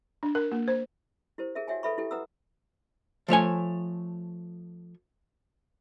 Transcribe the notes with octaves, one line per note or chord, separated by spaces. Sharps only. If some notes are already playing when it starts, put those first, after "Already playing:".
D4
A#4
A#3
C5
E4 G4 A#4 C5
G#4 A#4 E5
F#4 C#5 E5 G5 G#5
A4 B4 E5 B5 C#6
E4 G4 A4 G5
E4 B4 F#5 A#5 D#6 E6
F3 A3 C#5 G#5